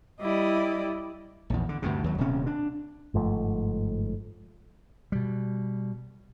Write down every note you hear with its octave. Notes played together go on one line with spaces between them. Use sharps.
G3 E4 D5 D#5
A#1 E2
D3
D2 G2 C3
D#2 F#3
D#1 D2 C3 C#4
D4
G1 G#2 F3 A3
B2 G3